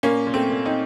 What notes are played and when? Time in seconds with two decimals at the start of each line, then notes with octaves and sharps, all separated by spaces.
0.03 A#2 A#3 C#4
0.27 A#2
0.34 A3 C4
0.50 A#2
0.65 C4 D#4